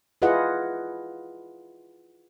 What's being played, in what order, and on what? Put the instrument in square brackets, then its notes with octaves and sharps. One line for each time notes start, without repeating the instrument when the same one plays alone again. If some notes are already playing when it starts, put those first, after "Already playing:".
[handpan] E4 F4 G#4 B4 D#5 F#5